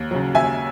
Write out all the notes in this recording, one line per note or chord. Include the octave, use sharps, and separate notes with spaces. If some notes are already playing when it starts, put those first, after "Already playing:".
Already playing: D#2
C#3 F#3
D#2 E5 G#5